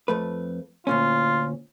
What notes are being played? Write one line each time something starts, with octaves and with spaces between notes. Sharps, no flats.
F2 A3 B4
D2 A#2 C#4 F4